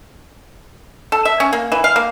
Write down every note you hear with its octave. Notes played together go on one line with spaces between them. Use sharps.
A4
E5
C#4
A#3
E3
F5
A#3